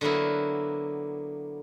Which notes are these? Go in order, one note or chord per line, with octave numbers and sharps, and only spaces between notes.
D3 F#3 A#3 B3 E4